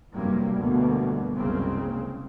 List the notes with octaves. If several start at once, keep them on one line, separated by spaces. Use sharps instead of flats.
F1 G2 C3 F#3 G3 A#3
G1 D2 B2 G3 A#3
F#1 C2 C#3 G#3 A#3 C4